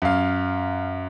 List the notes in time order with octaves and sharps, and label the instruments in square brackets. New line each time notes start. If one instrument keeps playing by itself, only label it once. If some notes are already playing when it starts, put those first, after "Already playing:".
[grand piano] F#2 F5